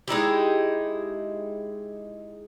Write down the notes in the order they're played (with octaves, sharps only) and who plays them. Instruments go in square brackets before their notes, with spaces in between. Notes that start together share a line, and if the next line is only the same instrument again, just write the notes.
[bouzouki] G#3 D#4 E4 G4